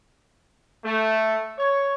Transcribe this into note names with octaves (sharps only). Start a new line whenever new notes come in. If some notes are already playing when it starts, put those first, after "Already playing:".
A3
C#5